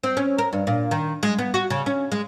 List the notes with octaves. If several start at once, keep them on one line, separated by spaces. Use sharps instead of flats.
C4
C#4
A#4
G2
A#2
D#3
G#3
B3
F#4
C#3
C#4
G#3